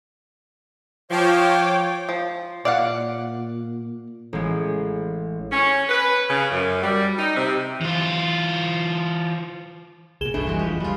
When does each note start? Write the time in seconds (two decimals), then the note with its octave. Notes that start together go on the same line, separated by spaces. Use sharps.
1.11 F3 C#5 G5 D6
2.09 F3
2.65 A#2 D5 F5 F#5
4.33 A1 G#3
5.52 C#4
5.89 B4
6.30 C#3
6.51 F#2
6.82 G3
7.18 D#4
7.36 C3
7.81 E3 F4
10.21 C2 A#2 G#4 E7 G7
10.34 F#1 C2 B2 E3 A3 D4
10.47 E3 G3 G#3 F#4
10.59 F1 E3 F3 G4
10.80 D2 G3 B3 F4